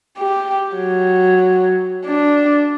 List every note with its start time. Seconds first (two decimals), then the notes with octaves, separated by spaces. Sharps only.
0.18 G4
0.76 F#3
2.06 D4